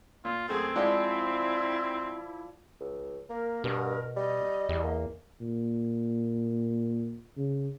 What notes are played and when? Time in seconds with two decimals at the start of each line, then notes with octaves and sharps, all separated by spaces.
0.25 A#2 F4
0.49 F#2 A3 C4 G#4
0.76 F3 G#3 E4 C5 D5 G5
2.80 C#2
3.30 A#3 A#4
3.64 G2 B2
4.16 G3 D#5
4.69 E2 G3
4.83 A#3
5.41 A#2
7.37 C#3